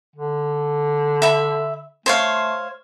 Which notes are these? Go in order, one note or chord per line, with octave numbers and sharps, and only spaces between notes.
D3
E5 B5
A3 C5 C#5 F5